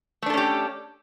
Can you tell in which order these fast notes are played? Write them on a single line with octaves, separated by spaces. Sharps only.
A3 D4 A4 C#4 G4